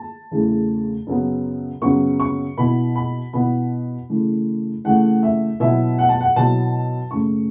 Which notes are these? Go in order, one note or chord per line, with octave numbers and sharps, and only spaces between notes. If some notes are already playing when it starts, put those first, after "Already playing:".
Already playing: A5
E2 C#3 A3 E4
F#2 C#3 F#3 B3
F#2 C#3 F#3 B3 C#6
C#6
B2 B3 E4 B5
B5
B2 B3 E4 B5
C#3 E3 A3
C#3 E3 A3 F#5
E5
B2 F#3 B3 E4 E5
F#5
A5
F#5
B2 F#3 B3 E4 A5
F#2 C#3 A3 C#6